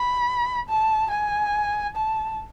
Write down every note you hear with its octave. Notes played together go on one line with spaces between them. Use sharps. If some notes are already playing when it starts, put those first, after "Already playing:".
Already playing: B5
A5
G#5
A5